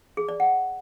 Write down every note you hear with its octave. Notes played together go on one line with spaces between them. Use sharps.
G#4
D5
F#5